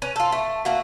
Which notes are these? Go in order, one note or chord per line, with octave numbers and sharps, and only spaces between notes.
C#4 B4
F4 A4
A3
A3 A#3 F#4